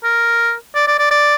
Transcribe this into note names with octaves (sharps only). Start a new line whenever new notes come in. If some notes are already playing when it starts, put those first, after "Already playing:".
A#4
D5
D5
D5
D5